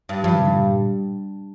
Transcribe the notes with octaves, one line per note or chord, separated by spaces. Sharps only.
G2
G2 F3
D#3
C3
D3
A#2